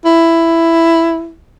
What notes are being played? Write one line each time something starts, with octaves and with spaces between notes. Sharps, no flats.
E4